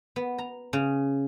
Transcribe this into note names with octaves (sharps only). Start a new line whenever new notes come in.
B3
A#5
C#3